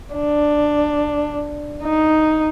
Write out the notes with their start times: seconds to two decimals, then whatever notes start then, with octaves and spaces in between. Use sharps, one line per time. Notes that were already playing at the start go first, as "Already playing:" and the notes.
0.15 D4
1.84 D#4